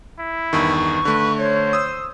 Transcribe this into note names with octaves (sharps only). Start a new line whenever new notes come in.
E4
E2 G2 D#3 C#6
D3 A3 B4
C5 C#5
D#6 E6